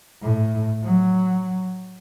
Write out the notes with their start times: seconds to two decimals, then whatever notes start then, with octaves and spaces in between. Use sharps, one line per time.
0.23 A2
0.83 F#3